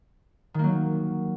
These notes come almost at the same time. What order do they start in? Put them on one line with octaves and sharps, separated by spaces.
D#3 A#3 F#3